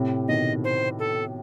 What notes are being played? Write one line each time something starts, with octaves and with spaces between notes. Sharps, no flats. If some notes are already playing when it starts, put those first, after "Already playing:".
Already playing: A2 C3
B2 D#3 D#5
C5
A4